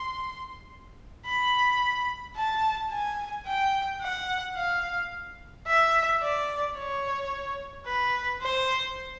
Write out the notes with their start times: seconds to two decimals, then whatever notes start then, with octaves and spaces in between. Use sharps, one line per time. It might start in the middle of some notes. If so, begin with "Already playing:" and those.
Already playing: C6
1.26 B5
2.36 A5
2.91 G#5
3.46 G5
4.02 F#5
4.57 F5
5.67 E5
6.22 D5
6.77 C#5
7.86 B4
8.42 C5